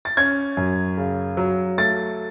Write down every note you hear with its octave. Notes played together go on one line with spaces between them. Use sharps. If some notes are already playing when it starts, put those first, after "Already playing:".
A6
C#4 G#6
F#2
C#3
F#3
A3 A6